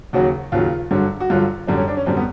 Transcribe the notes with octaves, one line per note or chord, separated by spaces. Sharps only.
D#2 C#3 F#3 F#4
D#2 C#3 F#3 F4
G2 D3 F#3
F#4
G2 D3 F#3 F4
F#2 D3 G3 D4
C#4
D4
C#4
F#2 D3 G3 C4
B3